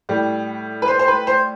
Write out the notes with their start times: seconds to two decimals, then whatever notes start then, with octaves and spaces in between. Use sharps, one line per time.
0.09 A2 G3
0.82 B4
0.88 C5
0.99 C5
1.08 B4
1.27 C5